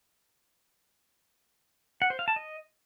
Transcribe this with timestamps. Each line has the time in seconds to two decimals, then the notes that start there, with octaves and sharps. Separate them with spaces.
2.02 F#5
2.10 C5
2.19 F5
2.28 A5
2.36 D#5